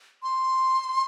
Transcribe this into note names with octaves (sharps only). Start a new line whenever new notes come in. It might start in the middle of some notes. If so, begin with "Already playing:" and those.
C6